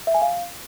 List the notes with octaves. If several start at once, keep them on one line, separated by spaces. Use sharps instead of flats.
E5
G#5
F5